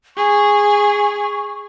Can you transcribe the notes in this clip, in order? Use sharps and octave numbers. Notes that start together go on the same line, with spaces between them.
G#4 C#6